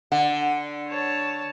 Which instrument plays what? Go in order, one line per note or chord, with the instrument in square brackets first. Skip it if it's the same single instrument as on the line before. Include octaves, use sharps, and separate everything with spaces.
[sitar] D3 [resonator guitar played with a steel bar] F#5
[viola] C#5 A5